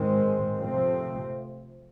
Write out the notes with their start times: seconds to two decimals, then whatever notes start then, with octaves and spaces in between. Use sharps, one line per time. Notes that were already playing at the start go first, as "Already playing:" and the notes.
Already playing: G#2 D#3 G#3 C4
0.57 C3 F3 A3 C4